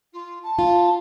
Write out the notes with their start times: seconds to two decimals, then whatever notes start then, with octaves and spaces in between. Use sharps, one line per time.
0.13 F4
0.42 A5
0.59 F4